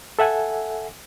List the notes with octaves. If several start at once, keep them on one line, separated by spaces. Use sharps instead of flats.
A4 E5 F#5 G#5